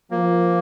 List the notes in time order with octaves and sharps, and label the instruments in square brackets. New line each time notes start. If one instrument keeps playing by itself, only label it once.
[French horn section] F3 [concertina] A#3